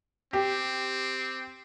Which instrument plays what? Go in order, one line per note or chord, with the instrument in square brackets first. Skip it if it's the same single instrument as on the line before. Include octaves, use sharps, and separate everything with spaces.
[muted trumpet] C4 [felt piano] G4